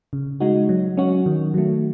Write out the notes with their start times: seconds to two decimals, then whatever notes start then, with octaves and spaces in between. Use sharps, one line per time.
0.13 C#3
0.40 G#3 D#4 F#4
0.69 F#3
0.97 C#4 F#4
1.26 D#3
1.54 F#3 A3